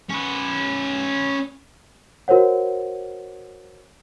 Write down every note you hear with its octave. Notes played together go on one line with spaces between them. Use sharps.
C#4 B4
F#4 A#4 C5 C#5 F#5